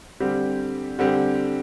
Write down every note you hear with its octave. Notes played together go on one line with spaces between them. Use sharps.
D3 G3 C4 G4
D3 G3 C4 G4